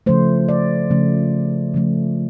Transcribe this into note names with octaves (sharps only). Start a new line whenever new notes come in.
C#3 F3 A3 C5
D5
C#3 F3 A3
C#3 F3 A3